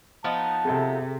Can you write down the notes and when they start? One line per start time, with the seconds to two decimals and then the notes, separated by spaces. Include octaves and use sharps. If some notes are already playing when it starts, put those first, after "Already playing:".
0.24 F3 B3 D#4 A5
0.65 C3 G#4 A4 E5